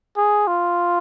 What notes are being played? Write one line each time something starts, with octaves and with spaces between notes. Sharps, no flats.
G#4
F4